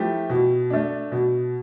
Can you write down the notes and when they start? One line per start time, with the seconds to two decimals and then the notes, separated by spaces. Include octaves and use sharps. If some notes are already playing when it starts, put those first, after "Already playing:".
Already playing: F3 A3 E4 G4
0.29 B2
0.70 A3 D4
1.12 B2